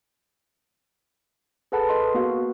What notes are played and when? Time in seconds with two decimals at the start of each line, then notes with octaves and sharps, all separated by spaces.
1.72 G#4 A4 B4 F#5 A5 B5
1.89 D#5 C6
2.14 A#3 B3 F#4 F5 F#5